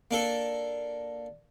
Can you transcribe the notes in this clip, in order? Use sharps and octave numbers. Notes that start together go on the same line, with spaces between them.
A#3 D4 A4